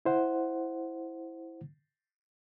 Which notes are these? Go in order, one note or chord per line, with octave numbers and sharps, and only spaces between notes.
E4 C5 F#5